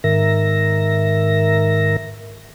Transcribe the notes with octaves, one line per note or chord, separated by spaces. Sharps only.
G#2 D#3 A#4 E5 A#6